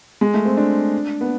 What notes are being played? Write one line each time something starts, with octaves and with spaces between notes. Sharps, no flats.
G#3
A3
C4
D4
B3